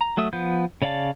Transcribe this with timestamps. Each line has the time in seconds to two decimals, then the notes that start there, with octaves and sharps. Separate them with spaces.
0.01 A#5
0.17 F#3 A3 E5 D#6
0.33 F3 B3 G6
0.82 C#3 C#5 D5 F5 A5